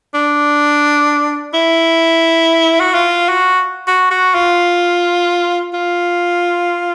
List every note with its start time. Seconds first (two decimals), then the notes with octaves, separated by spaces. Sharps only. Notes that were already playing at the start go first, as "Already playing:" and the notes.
0.15 D4
1.54 E4
2.81 F#4
2.94 F4
3.29 F#4
3.88 F#4
4.11 F#4
4.35 F4
5.74 F4